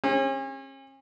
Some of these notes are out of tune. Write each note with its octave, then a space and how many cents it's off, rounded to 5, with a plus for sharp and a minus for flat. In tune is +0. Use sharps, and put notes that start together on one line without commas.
C#4 -40 G#4 -40